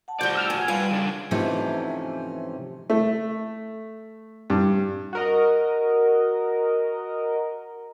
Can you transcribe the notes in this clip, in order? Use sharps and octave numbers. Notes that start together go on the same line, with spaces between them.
F#5 A5
F3 G3 F#4 D5 G6
E6 F6
A#2 G#5
G3 F4 G4 B4
C#3 D4
G#2 C3 E3 F3 A3 C#4
A3
G2
F#4 A#4 D#5